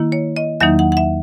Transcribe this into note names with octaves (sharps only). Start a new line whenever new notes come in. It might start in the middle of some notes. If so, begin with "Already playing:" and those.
Already playing: D#3 A#3 E4
C#5
D#5
E2 D#3 F#3 A#3 D#4 E5
F#5
F#5
E5